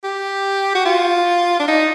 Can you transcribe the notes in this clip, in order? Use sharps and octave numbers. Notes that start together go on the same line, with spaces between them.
G4
F#4
F4
D4
D#4